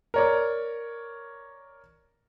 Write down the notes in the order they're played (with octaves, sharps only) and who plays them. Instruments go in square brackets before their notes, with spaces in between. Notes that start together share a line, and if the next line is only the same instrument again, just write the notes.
[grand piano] A#4 C#5 D5